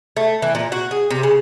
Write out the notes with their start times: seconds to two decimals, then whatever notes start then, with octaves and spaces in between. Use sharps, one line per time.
0.17 A3
0.42 E3
0.55 A#2
0.72 F#4
0.91 G#4
1.11 C3
1.23 C#3